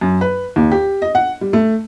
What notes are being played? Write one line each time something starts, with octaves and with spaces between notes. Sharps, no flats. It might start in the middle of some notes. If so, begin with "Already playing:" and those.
F#2
B4
D#2
G4
D#5
F#5
G3
A3